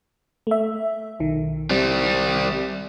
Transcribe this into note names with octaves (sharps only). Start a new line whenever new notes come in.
A3 E5
B1 D#3
G3 C4